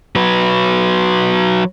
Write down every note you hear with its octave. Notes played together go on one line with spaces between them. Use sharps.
F#3 B4